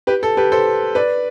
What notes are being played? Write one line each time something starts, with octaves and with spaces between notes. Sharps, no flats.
G4 B4
A4
G4 B4
A4 C5
B4 D5